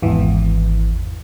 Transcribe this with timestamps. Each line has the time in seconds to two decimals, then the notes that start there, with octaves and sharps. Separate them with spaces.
0.02 G#1 E2 E3